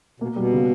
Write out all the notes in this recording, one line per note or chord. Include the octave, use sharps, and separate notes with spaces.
B2 A#3
B2 G3
C#3